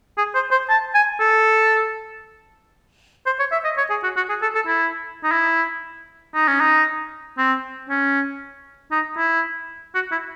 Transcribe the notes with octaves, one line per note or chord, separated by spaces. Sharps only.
G#4
C5
C5
A5
G#5
A4
C5
C#5
E5
D#5
C#5
G#4
F#4
F#4
G#4
A4
A4
E4
D#4
E4
D#4
C#4
D#4
C4
C#4
D#4
E4
F#4
E4